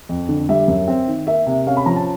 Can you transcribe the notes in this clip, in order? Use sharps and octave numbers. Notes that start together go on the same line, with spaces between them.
F2
D3
G3 E5
F#2
C4
D#3
A#3 E5
C3
C#4 F5
B5
F3 A#5
A5